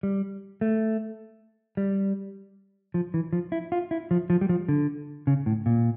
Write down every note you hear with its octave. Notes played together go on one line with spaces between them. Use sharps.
G3
A3
G3
F3
E3
F3
E4
F4
E4
F3
F3
G3
F3
D3
C#3
A2
A#2